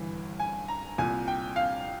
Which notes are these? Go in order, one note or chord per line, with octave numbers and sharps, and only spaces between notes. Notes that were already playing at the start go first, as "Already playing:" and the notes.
Already playing: G1 G2 E3
G#5
A#5
C2 A#2 G#5
G5
F5